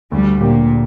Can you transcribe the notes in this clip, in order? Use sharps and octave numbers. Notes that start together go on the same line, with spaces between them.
D2 G3
A#2 D3 A#3 G4